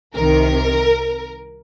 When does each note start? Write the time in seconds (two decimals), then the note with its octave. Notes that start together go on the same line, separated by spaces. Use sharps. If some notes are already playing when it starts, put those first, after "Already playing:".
0.15 C2 C3 D#3 A#4